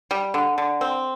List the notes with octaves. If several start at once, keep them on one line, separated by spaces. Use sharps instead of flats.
G3
D3
D3
C4